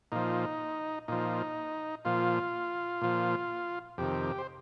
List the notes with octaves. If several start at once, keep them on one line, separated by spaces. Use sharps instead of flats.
A#2 F3 D#4
A#2 F3 D#4
A#2 F3 F4
A#2 F3
F2 C3 D#3 G4
C5